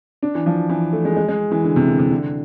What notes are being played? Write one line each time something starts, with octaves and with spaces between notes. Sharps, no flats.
D4
E3
F3
E3
A3
G#3
G#3
G#3
E3
D3
C3
D3
C3
D3